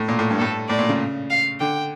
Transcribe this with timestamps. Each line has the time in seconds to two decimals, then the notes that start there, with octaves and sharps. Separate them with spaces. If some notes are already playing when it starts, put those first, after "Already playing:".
Already playing: A2
0.08 A#2
0.19 A2
0.31 G2
0.39 A2 A4
0.69 A2 D5
0.79 A#2
0.89 C#3
1.30 F5
1.60 D3 G5